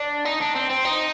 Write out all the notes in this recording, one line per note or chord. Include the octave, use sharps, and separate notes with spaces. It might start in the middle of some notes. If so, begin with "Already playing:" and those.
Already playing: D4
D#4
D4
C4
C4
D#4